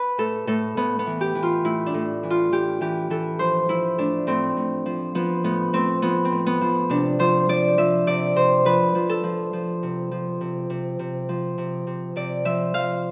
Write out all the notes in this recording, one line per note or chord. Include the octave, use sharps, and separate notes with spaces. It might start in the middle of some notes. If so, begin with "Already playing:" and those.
Already playing: B4
A2 A4
A2 A4
A2 B3
B3
E3
G4
E3
F4
A2 E4
D4
A2
E3
F4
E3 G4
E3 G4
E3 A4
F3 C5
F3 E4
A2 D4
A2 C4
A2
F3
F3 B3
A2 B3
A2 C4
F3 B3
C4
A2
B3
F3
C3 D4
F3 C5
F3 D5
F3 E5
C3 D5
C3 C5
F3 B4
F3
A4
F3
F3
C3
F3
C3
C3
C3
F3
C3
C3
C3 D5
F3 E5
F3 F5